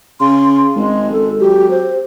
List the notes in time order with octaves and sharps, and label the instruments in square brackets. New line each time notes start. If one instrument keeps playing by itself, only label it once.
[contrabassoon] C#3 [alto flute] C6
[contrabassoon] G#1 [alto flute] G#3
[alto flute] A4
[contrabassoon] F#3 [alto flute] G4
[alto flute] C5